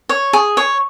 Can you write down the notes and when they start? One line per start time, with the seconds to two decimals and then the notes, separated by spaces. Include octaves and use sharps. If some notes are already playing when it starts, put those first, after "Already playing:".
0.09 C#5
0.33 G#4
0.57 C#5